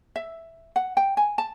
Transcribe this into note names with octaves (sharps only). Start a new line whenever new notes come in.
E5
F#5
G5
G#5
A5